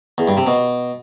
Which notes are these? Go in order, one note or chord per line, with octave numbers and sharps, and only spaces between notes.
E2
G2
C3
B2